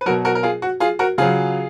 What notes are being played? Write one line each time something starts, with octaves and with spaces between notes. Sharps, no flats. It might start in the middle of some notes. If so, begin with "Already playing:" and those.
B4
B2 F#3 F#4 A#4
F#4 A#4
A#4
F4 G#4
F#4
F4 G#4
F#4 A#4
C#3 F#3 F4 G#4